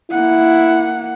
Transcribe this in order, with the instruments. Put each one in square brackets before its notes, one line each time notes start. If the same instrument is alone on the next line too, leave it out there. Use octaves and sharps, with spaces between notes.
[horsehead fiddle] A#3 F#5 [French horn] E4